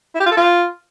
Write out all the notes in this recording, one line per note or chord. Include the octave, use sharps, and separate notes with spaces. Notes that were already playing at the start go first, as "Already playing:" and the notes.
E4
G4
F4
A4
F4